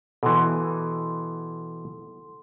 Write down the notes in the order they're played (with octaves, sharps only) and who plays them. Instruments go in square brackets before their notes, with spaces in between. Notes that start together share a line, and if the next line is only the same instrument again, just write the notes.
[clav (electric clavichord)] B2 E3 [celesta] A4 C6